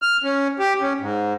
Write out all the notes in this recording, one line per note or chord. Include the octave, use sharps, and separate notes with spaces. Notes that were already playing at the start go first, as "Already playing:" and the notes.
F6
C#4
G4
C#4
G#2